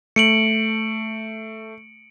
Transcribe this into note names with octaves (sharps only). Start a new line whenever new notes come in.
A3 C#7 D7 F#7